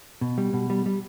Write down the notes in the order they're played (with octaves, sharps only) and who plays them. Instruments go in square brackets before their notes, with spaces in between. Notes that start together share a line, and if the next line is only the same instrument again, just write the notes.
[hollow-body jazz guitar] B2
G3
B2
G3
G3